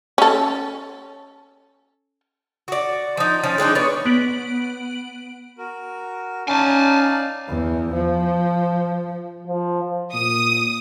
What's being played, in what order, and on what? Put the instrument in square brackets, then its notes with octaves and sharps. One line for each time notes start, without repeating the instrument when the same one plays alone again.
[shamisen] C#4 A4
[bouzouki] F#4 D5
F3 D#4
F3 C#4
G#3 C4 D4 D#4
B3 C#5 D5
[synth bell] B3 D7 F#7
[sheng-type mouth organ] F#4 A#4
[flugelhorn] C#4 [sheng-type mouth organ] D#4 D5 F5 [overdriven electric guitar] G#5 A5
[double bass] E2
F3
[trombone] F3
[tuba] A#2 [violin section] D#6